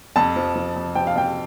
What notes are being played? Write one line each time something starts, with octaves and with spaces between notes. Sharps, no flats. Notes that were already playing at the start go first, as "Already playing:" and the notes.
F2 A5
F3
F3
F2
F3 G5
F5
F2 G5